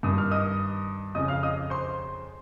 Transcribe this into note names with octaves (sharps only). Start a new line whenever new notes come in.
G2 D#3 D#6
F6
D#5 D#6
F2 C#3 D#5 D#6
F5 F6
D#5 D#6
C5 C6